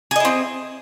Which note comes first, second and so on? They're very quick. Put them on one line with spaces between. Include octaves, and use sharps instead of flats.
G#4 D#5 E4 C4